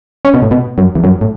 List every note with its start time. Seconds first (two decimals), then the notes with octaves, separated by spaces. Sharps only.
0.25 C#4
0.34 B2
0.42 A2
0.51 B2
0.78 F#2
0.95 E2
1.04 F#2
1.21 A2